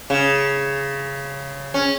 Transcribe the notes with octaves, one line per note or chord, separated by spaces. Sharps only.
C#3
C#4